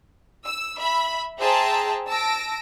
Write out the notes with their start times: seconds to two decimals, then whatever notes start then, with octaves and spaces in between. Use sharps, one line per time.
0.46 E6
0.77 E5 B5
1.39 G#4 C5 E5 G5 A5 A#5
2.07 A5 E6 A#6 D7